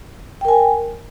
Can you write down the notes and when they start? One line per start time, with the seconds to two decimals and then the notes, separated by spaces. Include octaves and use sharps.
0.41 G5
0.45 A#4
0.48 G#5